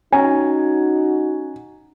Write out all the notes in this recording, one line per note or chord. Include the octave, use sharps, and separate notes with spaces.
C#4 D#4 F#4 G#5 A#5